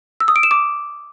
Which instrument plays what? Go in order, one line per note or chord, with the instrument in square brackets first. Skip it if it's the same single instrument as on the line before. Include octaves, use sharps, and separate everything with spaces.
[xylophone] E6
D#6
D7
E7
D6